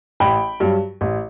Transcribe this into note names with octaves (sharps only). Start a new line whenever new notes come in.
A1 G5 B5
G2 F#3
A1